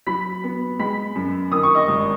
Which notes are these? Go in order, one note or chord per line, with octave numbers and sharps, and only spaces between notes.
F#3 B5 B6
B3
G#3 B5 B6
F#2
D#3 D#6
C#6
D#5 D#6
G#1